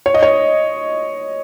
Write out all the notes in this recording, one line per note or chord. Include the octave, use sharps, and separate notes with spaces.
C#5
D#5
C#5